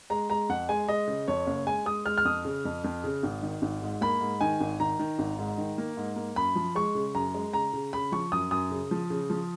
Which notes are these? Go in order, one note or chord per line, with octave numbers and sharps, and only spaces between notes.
G#3 A#5
G#3 A#5
F2 F#5
G#3 G#5
G#3 D#5
C#3
F2 C#5
F#1
G#3 G#5
G#3 D#6
G#3 F6
F6
F2 D#6
C#3
F2
F2
C#3
G#1
D#3
G#1
G#2
A#3 B5
G#2
D#3 G#5
G#1
D#3 A#5
D#3
G#1
G#2
D#3
A#3
G#2
A#3
F#2 B5
F3
G#3 C#6
C#3
F#2 A#5
G#3
C#3 A#5
C#3
C#3 B5
F3 C#6
F#2 D#6
F#2 D#6
C#3
F3
C#3
F3